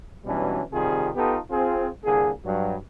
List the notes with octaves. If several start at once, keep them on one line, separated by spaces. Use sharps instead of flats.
B2 E3 F#3 G3 C#4 D4
C3 D#3 G3 C4 F4 G#4
B3 D#4 F4 G4 A4
C4 F4 G#4
C2 D3 A#3 G#4
G2 F#3